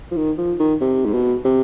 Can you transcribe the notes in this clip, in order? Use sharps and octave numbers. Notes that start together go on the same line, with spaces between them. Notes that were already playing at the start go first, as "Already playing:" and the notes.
F3
D#3
F3
D#3
C3
G#2
B2
C3